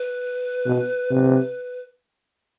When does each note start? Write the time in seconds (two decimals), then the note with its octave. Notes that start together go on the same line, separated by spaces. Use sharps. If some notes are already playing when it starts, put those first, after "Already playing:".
Already playing: B4
0.66 B2
1.10 C3